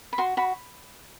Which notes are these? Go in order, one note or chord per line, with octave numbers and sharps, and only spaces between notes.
B5
F#4 C6
F#4 B5